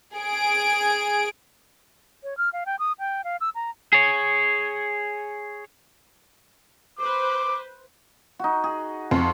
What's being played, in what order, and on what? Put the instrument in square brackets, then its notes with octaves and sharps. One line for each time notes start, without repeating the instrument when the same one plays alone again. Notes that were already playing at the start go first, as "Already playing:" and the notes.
[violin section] G#4 D7
[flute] C#5
F6
F5
G5
D#6
G5
F5
E6
A#5
[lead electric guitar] G#4 C#5
[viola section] B4 C5 [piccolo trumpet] D6
[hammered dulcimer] D#4 F#4
G#4
[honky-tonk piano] F2 [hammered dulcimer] C6 C#6